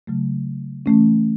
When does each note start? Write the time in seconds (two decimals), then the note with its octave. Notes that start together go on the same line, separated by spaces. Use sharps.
0.07 C#3 F#3 A3
0.86 E3 A3 C#4